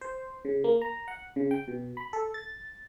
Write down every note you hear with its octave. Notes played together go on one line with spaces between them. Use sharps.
C5
C#3
A#3
A#5
F#5
C#3
G5
B2
B5
A4
A6